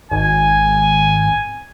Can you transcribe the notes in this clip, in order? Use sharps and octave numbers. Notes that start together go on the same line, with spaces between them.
G#1 G#5